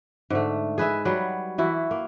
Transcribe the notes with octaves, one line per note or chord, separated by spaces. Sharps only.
G#2 D3 A3
G#4 B4 D#5 E5
F#3 G3 B4
E3 E4 F#4
A#3